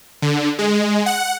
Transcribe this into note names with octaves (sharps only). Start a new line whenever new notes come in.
D3
G#3
F#5